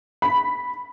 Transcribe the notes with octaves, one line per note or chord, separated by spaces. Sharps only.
B5